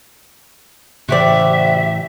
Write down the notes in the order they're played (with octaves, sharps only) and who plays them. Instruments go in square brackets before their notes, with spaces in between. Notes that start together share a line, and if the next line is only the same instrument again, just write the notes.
[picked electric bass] A2 E3 [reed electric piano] C#3 C5 [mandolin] F#4 G4 D5 [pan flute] E5